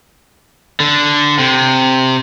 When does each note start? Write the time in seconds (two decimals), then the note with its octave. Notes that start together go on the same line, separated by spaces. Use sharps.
0.80 D3
1.39 C3